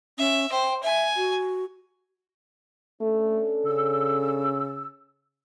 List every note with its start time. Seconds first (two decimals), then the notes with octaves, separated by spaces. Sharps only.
0.18 C#4 E5
0.52 C5 G5
0.83 E5 G#5
1.17 F#4
3.01 A3 C#4 D4 A4
3.65 C#3 E6